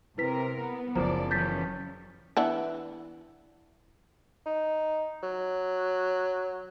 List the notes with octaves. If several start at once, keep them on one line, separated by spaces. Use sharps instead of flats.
C3 E4 A#4 B4 B6
B3
F#1 F3 C5 D5 A#5
E3 F#3 C#4 G6 A6 B6
E3 B3 D4
D#4
F#3